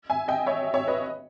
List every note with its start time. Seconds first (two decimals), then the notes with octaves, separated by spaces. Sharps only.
0.10 E5 G#5
0.28 D#5 G5
0.46 C#5 E5
0.74 C#5 E5
0.88 B4 D#5